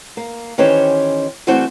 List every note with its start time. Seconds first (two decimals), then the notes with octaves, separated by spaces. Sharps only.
0.17 A#3
0.58 D#3 E3 C#4 G4 C5 C#5
1.47 E3 G3 A3 C4 F#4 C5